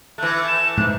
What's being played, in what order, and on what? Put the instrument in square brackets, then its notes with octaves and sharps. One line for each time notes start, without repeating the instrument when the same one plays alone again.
[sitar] E3 A3 [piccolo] F#6
[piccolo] E7
[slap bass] G#2 G#3 [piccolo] F#6